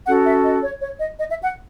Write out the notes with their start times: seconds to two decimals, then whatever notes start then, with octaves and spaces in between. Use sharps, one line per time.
0.07 C#4 F#4 A4 F#5
0.25 E5
0.44 D#5
0.63 C#5
0.81 C#5
0.99 D#5
1.19 D#5
1.30 E5
1.42 F#5